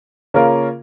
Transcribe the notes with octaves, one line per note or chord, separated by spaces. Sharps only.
C#3 A#3 C#4 F4 A#4